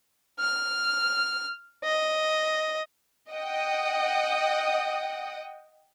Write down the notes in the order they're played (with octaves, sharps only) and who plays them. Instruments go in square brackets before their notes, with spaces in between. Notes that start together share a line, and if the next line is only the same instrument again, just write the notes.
[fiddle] F6
D#5
[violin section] D#5 F#5 G5 D#6